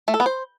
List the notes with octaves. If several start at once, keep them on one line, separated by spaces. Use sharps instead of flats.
A3
A4
B3
C5